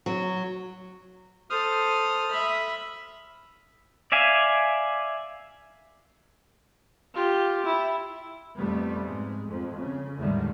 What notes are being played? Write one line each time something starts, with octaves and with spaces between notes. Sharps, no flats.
F#3
A4 C5 D#6 F6
E5 B5
D5 E5 F5 G#5
F4 G4
E4
F2 G3 A3 B3
G#2 G#3
F2
C#3
E2 A2 D3 D#3 G3 G#3